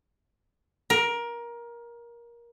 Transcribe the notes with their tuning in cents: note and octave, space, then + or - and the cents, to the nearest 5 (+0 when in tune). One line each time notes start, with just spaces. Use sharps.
A#4 +20